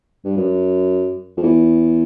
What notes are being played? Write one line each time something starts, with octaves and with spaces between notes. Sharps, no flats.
G2
F#2
F2
E2